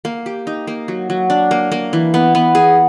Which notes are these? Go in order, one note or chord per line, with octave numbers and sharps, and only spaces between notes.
A#3
G4
D#4
A#3
F#3
F#3
D4
A#3
A#3
E3
B3
B3
G#4